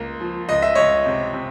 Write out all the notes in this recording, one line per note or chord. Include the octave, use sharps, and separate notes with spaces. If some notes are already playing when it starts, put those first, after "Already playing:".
Already playing: C#2 A#3
F3
C#2 D#5
E5
C#2 C#5 D#5
C3
C3